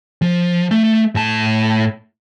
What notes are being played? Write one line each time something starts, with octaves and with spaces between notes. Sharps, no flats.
F3
A3
A2 A5